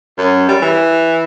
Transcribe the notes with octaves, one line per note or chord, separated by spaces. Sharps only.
F#2
G3
E3